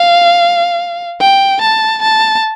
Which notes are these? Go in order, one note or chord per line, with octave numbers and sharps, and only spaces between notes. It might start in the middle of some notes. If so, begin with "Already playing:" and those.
Already playing: F5
G5
A5
A5